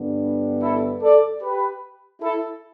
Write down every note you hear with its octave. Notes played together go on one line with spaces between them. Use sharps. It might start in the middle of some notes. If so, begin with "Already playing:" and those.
Already playing: G2 D3 B3 D4
E4 A4
A4 D5
G4 B4
E4 A4